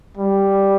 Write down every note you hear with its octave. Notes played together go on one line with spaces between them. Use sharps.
G3